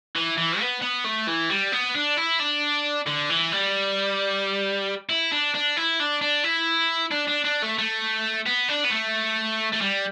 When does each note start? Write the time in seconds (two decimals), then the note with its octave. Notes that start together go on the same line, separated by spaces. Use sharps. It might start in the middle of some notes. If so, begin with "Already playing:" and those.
0.16 E3
0.38 E3
0.60 B3
0.82 B3
1.05 A3
1.28 E3
1.50 G3
1.72 B3
1.95 D4
2.17 E4
2.40 D4
3.07 D3
3.30 E3
3.52 G3
5.10 E4
5.32 D4
5.54 D4
5.77 E4
6.00 D4
6.22 D4
6.44 E4
7.11 D4
7.28 D4
7.45 D4
7.63 A3
7.79 A3
8.46 B3
8.69 D4
8.85 B3
8.91 A3
9.73 A3
9.81 G3